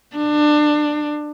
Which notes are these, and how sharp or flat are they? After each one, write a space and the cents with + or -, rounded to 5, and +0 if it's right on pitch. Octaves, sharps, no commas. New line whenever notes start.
D4 +25